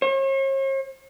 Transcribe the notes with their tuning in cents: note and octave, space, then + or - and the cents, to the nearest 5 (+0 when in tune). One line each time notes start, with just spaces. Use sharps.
C#5 -45